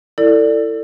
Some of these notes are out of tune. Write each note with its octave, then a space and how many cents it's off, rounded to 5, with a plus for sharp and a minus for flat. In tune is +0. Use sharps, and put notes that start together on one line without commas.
E4 +10 A4 +30 D5 -5